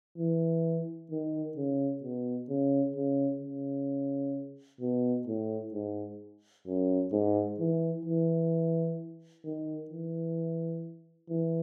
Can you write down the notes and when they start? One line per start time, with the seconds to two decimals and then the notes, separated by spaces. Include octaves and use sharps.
0.18 E3
1.11 D#3
1.57 C#3
2.03 B2
2.49 C#3
2.96 C#3
3.42 C#3
4.81 B2
5.27 A2
5.74 G#2
6.67 F#2
7.12 G#2
7.60 E3
8.06 E3
9.45 D#3
9.91 E3
11.30 E3